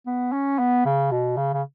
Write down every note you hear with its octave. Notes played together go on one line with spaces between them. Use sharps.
B3
C#4
B3
C#3
B2
C#3
C#3